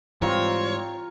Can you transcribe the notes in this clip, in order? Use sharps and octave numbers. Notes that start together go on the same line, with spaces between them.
G#2 E3 G3 C4 F4 A#4 C#5